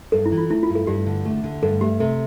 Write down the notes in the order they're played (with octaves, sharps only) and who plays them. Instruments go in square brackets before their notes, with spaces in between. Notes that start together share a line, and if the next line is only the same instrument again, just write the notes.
[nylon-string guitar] G2 [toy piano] A4
[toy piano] E4
[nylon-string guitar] E3
[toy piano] F4
[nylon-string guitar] A3 [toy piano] E4
[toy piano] F4
[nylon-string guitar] G2
[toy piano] A4
[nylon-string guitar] G2 [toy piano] G4
[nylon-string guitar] D3
A3
D3
[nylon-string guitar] G2 [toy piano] A4
[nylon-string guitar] A3 [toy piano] G4
[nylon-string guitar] C3 [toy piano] A4